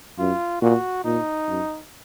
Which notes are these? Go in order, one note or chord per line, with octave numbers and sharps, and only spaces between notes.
F#2 F4
A#2 F#4
A#2 D#4
F#2